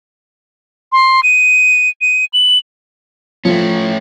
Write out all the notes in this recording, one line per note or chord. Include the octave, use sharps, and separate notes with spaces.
C6
D#7
D#7
F#7
F3 A3 C#4